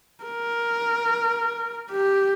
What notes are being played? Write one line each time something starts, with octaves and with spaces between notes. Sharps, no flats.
A#4
G4